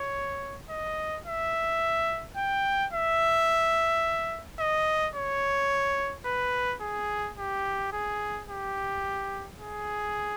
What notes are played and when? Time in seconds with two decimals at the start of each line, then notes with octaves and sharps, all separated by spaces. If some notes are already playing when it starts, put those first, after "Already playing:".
Already playing: C#5
0.70 D#5
1.26 E5
2.37 G5
2.93 E5
4.60 D#5
5.16 C#5
6.26 B4
6.82 G#4
7.38 G4
7.93 G#4
8.49 G4
9.60 G#4